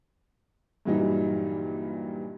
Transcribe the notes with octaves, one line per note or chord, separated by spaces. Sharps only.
G2 A#2 E3 F#3 G3 D#4